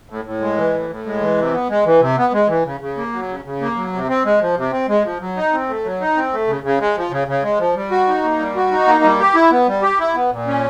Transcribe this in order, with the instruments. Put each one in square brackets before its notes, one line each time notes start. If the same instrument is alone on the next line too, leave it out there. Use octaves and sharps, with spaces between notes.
[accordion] A2
A2
G#3
E3
A2
A2
G#3
E3
C3
B3
G#3
E3
C3
B3
G#3
E3
C#3
C#3
A#3
F#3
C#3
C#3
A#3
F#3
C3
C4
G#3
F3
C3
C4
G#3
F3
F#3
D#4
C4
A3
F#3
D#4
C4
A3
C#3
C#3
G#3
F3
C#3
C#3
G#3
F3
G3
F#4
D#4
A#3
G3
F#4
D#4
A#3
G3
G4
E4
B3
G3
G4
E4
B3
A#2
C#4